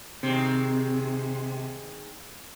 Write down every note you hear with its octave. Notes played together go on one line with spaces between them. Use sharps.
C3 D#3 G#3 C4